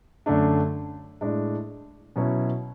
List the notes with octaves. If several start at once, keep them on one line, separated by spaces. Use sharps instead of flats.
F#2 D3 A3 D4
A2 G#3 D4
B2 F#3 C#4 E4